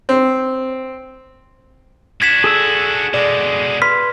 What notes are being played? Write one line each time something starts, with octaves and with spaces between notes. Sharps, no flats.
C4
D4 F#4 G#6 B6 E7
G#4 A4 E6
B2 G#3 D5
B4 C6 F6 B6